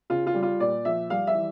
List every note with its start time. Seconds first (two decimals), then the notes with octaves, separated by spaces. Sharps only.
0.10 C#3 F4
0.27 F4
0.34 G3
0.43 F4
0.60 A#2 D5
0.85 F3 E5
1.10 G3 F5
1.27 E5
1.35 E3